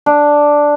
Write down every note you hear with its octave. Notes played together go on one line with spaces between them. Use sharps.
D4